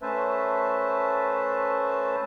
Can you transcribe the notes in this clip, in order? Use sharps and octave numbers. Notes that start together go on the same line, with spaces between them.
A3 C#4 B4 C5 E5 A5